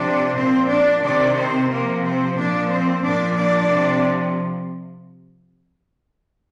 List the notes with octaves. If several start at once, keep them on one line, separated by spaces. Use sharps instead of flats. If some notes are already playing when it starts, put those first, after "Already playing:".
Already playing: C3 F3 D4 D5
A#2 F3 C4 C5
D4 D5
C3 D#3 D4 D5
C4 C5
C3 F3 A#3 A#4
C4 C5
A#2 F3 D4 D5
C4 C5
A#2 F3 D4 D5
D4 D5
C3 F3